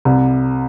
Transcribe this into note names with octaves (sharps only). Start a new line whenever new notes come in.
C2 C3